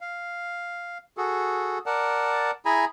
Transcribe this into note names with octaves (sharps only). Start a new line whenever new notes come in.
F5
F#4 G#4 A4
A#4 D5 F#5 A5
E4 G#4 G#5 A#5 B5